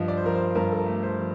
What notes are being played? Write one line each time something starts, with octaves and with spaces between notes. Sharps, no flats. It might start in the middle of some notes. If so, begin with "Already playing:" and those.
Already playing: G2 F3 D#5
D5
C5
F3 A#4
C5
G2 A#4
A4
A#4
A3
C5
F3